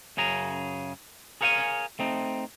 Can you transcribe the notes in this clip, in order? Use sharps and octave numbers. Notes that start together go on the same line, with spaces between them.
F#2 C#3 G#4 A#5
G#4 A#4 C#5 F5 F#5 G#5
A3 C4 D#4